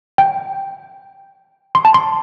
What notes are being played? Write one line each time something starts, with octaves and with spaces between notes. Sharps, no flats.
G5
C6
A5
C6